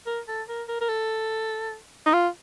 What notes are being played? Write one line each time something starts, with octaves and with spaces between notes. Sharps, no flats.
A#4
A4
A#4
A#4
A#4
A4
D#4
F4